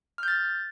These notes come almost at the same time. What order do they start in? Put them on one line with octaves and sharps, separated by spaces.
F6 G6 A6